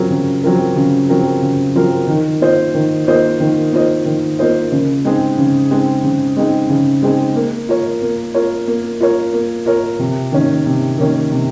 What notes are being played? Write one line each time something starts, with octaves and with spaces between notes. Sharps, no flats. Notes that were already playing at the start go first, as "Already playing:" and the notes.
Already playing: C#3 F#3 C4 F4 A#4
C#3
F#3 C4 F4 A#4
C#3
F#3 C4 F4 A#4
C#3
F#3 C4 F4 A#4
D#3
A#3 F4 C5 D#5
D#3
A#3 F4 C5 D#5
D#3
A#3 F4 C5 D#5
D#3
A#3 F4 C5 D#5
C#3
G#3 C4 D#4 G#4
C#3
G#3 C4 D#4 G#4
C#3
G#3 C4 D#4 G#4
C#3
G#3 C4 D#4 G#4
A#3
F4 A#4 C#5
A#3
F4 A#4 C#5
A#3
F4 A#4 C#5
A#3
F4 A#4 C#5
C3
D#3 A#3 C#4
C3
D#3 A#3 C#4
C3